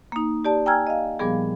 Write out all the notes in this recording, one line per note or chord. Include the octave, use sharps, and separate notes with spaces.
A#3 D#4
G4 D5 A5
G5 G#5 A#5 E6 F6 G#6
D#5 F5
A#2 F3 G3 B3 G#4